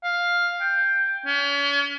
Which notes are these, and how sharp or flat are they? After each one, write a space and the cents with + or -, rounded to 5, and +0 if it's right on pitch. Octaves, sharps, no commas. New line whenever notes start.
F5 +5
G5 +10
C#4 +40